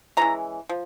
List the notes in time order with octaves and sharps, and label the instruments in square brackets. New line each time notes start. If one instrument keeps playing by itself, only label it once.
[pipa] E3 G#3 C#4 E4 A#5
F3